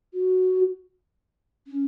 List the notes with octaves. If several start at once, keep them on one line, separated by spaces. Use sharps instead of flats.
F#4
C#4